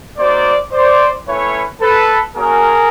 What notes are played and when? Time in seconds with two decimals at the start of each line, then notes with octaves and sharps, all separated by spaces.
0.18 A#3 D#4 F#4 C5 D5
0.72 C5 D5
1.27 A3 C#4 E4 B4 C#5
1.81 A4 B4
2.36 A#3 C#4 F#4 G#4 A#4